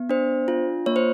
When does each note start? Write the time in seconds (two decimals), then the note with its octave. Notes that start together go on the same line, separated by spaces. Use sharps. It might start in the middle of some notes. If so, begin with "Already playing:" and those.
Already playing: B3
0.09 D4 C5
0.48 F4
0.86 A#3 C#5
0.96 C5